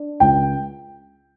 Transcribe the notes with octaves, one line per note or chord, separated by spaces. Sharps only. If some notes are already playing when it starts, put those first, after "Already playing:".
Already playing: D4
C#2 G5